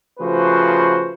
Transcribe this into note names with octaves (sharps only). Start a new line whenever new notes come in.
C#3 F3 A3 F#4 B4 C5